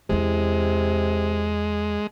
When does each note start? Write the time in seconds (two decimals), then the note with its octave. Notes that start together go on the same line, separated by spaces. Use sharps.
0.09 E2 C3 G#3 E4